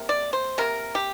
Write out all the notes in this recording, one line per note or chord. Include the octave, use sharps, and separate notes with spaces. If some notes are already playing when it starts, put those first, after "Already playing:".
Already playing: C3 A#3
D5
C5
C3 A#3 A#4
G4